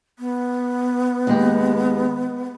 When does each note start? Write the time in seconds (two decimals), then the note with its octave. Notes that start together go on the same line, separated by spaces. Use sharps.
0.19 B3
1.27 D#2 G#3 G4